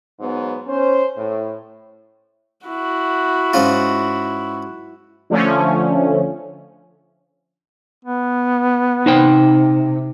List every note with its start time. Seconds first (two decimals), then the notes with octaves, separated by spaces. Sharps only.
0.20 G#2 F#3 B3
0.67 C#4 C5
1.17 A2
2.66 E4 F#4
3.54 G#2 C#4 F4
5.30 D3 F3 A3 C#4
8.05 B3
9.06 C3 D#4 C5 G5